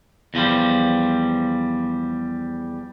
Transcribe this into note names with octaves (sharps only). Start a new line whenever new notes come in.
E2 F3 G3